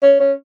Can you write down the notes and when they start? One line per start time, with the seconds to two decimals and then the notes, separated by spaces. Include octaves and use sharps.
0.03 C#4
0.20 C#4